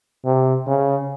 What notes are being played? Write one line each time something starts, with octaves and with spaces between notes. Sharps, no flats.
C3
C#3